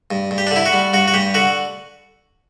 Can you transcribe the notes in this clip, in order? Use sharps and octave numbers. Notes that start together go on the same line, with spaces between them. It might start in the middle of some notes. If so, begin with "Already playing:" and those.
G2
G2
G4
D4
D3 E4
F#4
G3
G2 F#4
F#4
G2 G4
D3 F#4